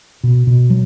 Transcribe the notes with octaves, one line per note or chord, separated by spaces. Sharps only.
B2
B2
F#3